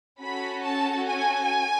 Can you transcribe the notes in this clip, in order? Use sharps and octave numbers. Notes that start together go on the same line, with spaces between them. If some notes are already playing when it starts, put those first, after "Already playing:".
C#4 F#4 A4 B5
A5
G#5